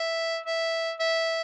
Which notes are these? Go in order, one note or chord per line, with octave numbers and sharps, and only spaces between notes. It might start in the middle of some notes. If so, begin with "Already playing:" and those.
Already playing: E5
E5
E5